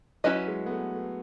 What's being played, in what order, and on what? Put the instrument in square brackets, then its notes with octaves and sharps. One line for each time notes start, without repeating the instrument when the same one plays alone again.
[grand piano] F#3 [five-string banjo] C#4 E4 B4 D#5
[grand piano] G#3
B3
A3
A3